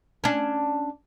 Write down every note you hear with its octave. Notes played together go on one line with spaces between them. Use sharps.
C#4 D4